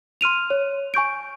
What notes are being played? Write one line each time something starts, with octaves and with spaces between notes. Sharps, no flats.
C6 F6 D#7 F7
C#5
G#5 C#6 G6 D7